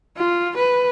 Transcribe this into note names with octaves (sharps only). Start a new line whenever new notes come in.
F4
B4